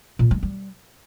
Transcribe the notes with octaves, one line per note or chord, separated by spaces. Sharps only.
A#2
G#3
G3